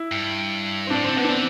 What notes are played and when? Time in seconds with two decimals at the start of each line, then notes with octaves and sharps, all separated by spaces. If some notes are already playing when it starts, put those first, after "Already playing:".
Already playing: E4
0.12 G2
0.87 C4
0.90 A2 D4
1.04 D3 C4
1.17 D3 B3
1.24 D4
1.29 E3 C4